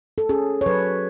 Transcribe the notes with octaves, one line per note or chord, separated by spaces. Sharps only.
A4
C#4 G#4
C#5
F#3 B4